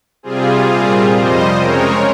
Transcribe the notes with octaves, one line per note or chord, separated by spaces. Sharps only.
C3 G3 C4 F4 G#4
A#2 G3 C4
F2 C3 G3 C5 D#5
C#3 G#3 C4 A#4 C#5